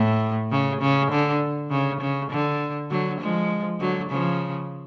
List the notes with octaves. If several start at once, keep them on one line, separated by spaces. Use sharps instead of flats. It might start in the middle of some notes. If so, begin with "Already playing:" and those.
Already playing: A2
C#3
C#3
D3
C#3
C#3
D3
D3 F#3
F3 G#3
D3 F#3
C#3 F3